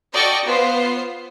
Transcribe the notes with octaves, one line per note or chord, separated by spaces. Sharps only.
F#4 A4 D5 D#5 G5 C#6
B3 F4 C5 C7